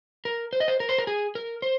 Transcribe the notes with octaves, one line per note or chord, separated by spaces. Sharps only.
A#4
C5
D#5
C5
A#4
C5
A#4
G#4
A#4
C5